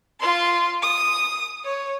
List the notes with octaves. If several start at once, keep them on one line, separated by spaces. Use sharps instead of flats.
F4 C6
D#6
C#5